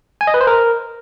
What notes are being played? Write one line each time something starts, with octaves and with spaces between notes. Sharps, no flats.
G#5
D#5
B4
C5
A#4